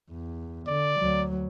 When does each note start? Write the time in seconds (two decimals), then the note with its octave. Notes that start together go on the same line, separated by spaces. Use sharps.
0.11 E2
0.68 D3 D5
1.00 D2 F#3